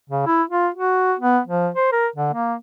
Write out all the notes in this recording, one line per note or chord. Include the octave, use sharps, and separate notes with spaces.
C#3
E4
F4
F#4
B3
F3
C5
A#4
D3
A#3